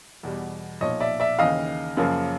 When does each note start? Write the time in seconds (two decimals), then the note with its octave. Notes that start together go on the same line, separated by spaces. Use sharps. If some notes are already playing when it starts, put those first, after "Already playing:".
0.23 E2 B2 G3
0.81 B1 A#2 F3 C#5 D#5
1.00 D5 E5
1.20 D5 E5
1.39 D#2 C#3 E3 D#5 F5
1.97 F#2 C#3 F3 A#3